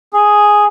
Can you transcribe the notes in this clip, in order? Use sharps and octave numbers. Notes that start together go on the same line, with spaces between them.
G#4